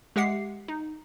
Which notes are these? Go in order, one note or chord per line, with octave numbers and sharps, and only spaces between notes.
G#3 G4 E5 F#5 C7
D#4